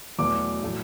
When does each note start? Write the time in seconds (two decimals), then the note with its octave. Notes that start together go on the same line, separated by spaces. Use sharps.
0.19 E2 B2 F#3 A3 D6
0.62 A2 F#3 A3